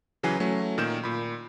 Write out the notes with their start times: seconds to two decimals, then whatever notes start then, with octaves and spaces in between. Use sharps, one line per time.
0.23 C#3 E3 F#3 B4 G#5 C7
0.40 F#3 A3 C#4
0.78 A#2 D#3 A#4 G6 E7
1.04 A#2 B5